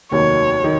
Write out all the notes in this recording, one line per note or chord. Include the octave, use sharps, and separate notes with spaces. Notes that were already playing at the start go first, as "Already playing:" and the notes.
F1 D#2 D#3 F#3 C#5
D#3